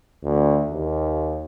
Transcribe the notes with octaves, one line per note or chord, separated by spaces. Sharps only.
D2
D#2